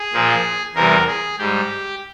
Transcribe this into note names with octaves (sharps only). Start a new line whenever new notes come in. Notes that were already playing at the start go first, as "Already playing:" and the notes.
Already playing: G#4
A#2 F3
E2 C3 E3 G3 A#4
G#4
G#2 G3 G4